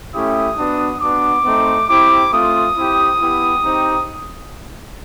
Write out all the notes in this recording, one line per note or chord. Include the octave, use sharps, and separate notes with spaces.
A3 C#4 E4 G4 D#6
B3 D4 F#4
B3 D4 F#4 D6
A3 C4 D#4
C4 E4 G4 D6
A3 C4 F4 D#6
C4 E4 G4
B3 E4 G4
C4 D#4 G4